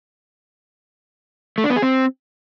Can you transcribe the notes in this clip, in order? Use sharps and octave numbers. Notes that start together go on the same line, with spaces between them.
A3
D4
B3
G#4
C4